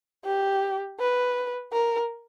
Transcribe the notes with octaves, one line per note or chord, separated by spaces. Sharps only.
G4
B4
A#4